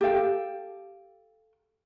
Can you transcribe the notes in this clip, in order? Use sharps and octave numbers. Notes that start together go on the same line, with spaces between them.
G4 A4 F5 G5